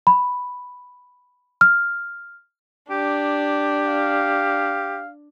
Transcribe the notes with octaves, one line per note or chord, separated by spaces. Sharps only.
B5
F6
D4 G4
F5